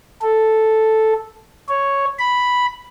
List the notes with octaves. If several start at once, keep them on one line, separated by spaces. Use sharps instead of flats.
A4
C#5
B5